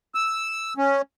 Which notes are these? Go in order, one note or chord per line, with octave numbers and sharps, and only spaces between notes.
E6
C#4